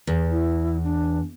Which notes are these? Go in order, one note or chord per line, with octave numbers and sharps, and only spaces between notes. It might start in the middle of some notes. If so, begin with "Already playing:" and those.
E2
E4
D4